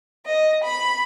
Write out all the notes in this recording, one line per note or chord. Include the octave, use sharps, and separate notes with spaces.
D#5
B5